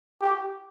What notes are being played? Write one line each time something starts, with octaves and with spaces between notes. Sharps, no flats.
G4